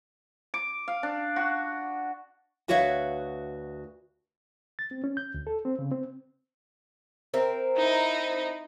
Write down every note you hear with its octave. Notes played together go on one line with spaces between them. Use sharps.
D6
F5
D4
F#4
D2 F#4 B4 C#5 E5 F5
A6
C4
C#4
G6
D2
A4
C4
C#3
C4
C4 A#4 E5
D#4 E4